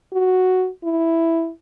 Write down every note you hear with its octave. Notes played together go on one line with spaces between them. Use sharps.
F#4
E4